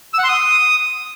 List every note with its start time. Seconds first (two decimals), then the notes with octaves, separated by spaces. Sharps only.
0.13 E6
0.18 F#5
0.23 C6
0.28 D#6